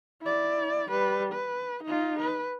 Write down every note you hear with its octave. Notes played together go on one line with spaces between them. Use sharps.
E4 D5
G3 B4
B4
D#4 F4
B4